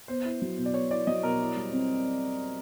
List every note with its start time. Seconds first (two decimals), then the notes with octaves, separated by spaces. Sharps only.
0.08 B3 C5
0.25 E4
0.42 F#3
0.58 B2
0.66 D5
0.74 B3 C#5
0.91 E4 D5
1.07 F#3 D#5
1.23 B2 A#4
1.40 E4
1.56 G3
1.72 C4